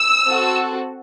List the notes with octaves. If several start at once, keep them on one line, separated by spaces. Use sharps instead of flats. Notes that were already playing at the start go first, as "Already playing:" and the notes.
Already playing: E6
C4 F#4 A4